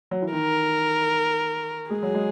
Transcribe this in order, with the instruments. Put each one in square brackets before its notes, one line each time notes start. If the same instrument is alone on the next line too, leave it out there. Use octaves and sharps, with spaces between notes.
[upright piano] F#3
E3
[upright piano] D#3 [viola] A#4
[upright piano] G#3 [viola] G#4
[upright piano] F#3
G#3